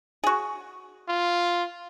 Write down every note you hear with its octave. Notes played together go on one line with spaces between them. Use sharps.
F#4 G#4
F4